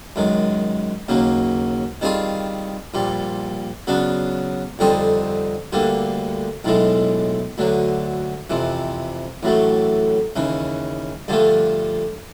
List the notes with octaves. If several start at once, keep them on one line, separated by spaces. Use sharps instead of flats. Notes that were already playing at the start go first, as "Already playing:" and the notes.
F#2 D#3 G#3
D#2 C#3 F#3 A#3
D#3 G3 C4 F4 G#4
A#1 A#2 G3
C#3 F#3 B3 D4
F2 D3 G3 C4 D#4
D2 D3 G3 A#3
B1 A2 E3 G#3
D2 D3 F#3
F2 C3 E3
A1 A2 F#3 A3
D#2 C#3 E3
G2 D3 F3 A3